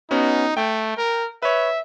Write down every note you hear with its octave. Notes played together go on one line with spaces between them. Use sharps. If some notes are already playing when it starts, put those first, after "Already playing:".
B3 C#4 D#4 F#4
A3 G5
A#4
B4 C#5 E5